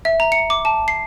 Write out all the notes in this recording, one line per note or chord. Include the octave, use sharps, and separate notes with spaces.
E5
A#5
C#7
D6
A5
C7